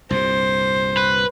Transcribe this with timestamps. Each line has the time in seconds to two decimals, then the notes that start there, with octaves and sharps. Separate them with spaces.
0.11 C2 G2 A#2 C5
0.97 B4